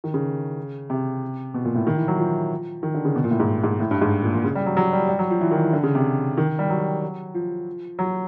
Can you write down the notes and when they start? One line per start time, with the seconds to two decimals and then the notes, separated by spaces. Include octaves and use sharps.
0.04 D#3
0.14 C#3
0.90 C3
1.54 B2
1.65 A#2
1.76 A2
1.87 D#3
1.97 E3
2.08 F#3
2.19 F3
2.83 D#3
2.94 D3
3.05 C#3
3.16 B2
3.24 A#2
3.31 A2
3.40 G#2
3.64 G#2
3.80 A2
3.91 G2
4.01 G#2
4.23 A#2
4.34 A#2
4.44 C#3
4.55 G3
4.66 F#3
4.77 F#3
4.93 G3
5.09 G3
5.19 F#3
5.30 F3
5.41 E3
5.51 D#3
5.63 E3
5.73 D3
5.83 C#3
5.95 C3
6.37 D#3
6.59 G3
6.70 F#3
7.34 F3
7.99 F#3